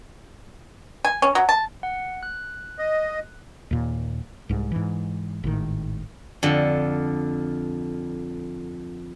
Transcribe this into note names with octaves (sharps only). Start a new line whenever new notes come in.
G#5
C#4
F#3
A5
F#5
F#6
D#5
D#2 A#2
C2 G#2
G#2 E3
G#1 A2 D#3
F2 D3